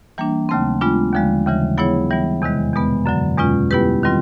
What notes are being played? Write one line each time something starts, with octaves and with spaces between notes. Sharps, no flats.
E3 G3 A#3 D4
D#2 C#3 F#3 A3 C4
G#3 B3 D4 F4
D#2 D3 F3 G#3
D#2 C#3 E3 G3
F#3 B3 E4 G#4 C#5
E3 G3 B3
E2 C3 D#3 G#3
E2 B2 G#3 B3
F#2 D3 F#3
E2 B2 G#3 C#4 F4
G3 B3 E4 G4 B4
D#3 G3 C4 F4